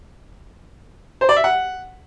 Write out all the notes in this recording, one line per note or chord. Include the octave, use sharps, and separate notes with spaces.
C5
D5
E5
F#5